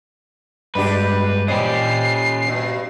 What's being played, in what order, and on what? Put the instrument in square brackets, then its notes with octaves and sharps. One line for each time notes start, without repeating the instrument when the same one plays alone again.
[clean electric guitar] G2 G#3 [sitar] B2 D4 G4 [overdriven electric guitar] B4 [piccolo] B5
[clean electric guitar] A#2 C5 D#5 [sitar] G3 [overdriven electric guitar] C#4 G4 [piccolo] C7
[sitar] G2 B2